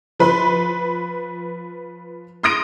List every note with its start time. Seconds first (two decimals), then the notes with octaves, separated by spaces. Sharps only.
0.20 F3 B4 B5 C6
2.43 C6 D#6 A#6 D7